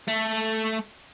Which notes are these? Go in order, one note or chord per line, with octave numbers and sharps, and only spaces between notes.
A3